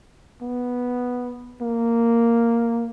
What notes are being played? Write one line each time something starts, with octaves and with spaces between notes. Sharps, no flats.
B3
A#3